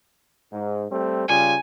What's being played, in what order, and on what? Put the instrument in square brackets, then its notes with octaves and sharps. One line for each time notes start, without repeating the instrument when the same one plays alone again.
[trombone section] G#2
G3 A3 C4
[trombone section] C#3 G3 F4 [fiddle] G#5